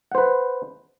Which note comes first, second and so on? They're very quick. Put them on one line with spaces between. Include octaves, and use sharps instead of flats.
F#5 C5 B4